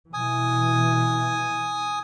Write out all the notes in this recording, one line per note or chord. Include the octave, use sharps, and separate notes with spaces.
B2 E3 G#5 D#6